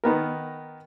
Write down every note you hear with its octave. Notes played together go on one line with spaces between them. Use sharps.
D#3 B3 A#4